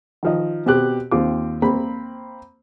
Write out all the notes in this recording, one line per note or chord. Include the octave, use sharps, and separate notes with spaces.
D#3 F3 D#5
B2 C4 G4 F#6
D#2 C4 F4 D6
A#3 C4 B5